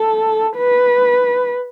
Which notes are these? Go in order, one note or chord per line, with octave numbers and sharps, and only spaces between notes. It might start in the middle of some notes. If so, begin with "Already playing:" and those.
Already playing: A4
B4